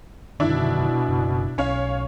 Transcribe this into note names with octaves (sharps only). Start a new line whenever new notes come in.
F#2 B2 D3 D#3 D4 E4
F#1
B1 C#4 C#5 F5